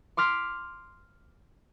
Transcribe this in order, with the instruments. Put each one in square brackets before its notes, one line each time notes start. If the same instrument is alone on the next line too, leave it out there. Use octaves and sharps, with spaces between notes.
[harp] C6 D6 F6 B6